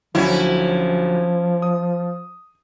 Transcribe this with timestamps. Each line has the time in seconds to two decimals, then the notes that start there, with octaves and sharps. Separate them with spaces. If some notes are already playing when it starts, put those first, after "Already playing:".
0.15 D2 F3 F#3 C#4 E4
1.62 D#6